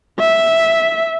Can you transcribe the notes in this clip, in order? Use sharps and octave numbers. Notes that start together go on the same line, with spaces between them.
E5